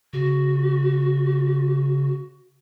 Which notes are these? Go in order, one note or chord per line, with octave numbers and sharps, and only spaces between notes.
C#3 F#4